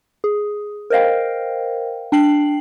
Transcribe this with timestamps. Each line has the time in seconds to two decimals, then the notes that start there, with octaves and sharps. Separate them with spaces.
0.24 G#4
0.90 A#4 C5 D#5 F5 G5
2.12 D4 G5 C7 F#7